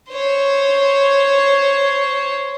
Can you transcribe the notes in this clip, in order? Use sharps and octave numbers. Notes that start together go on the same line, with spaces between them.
C5 C#5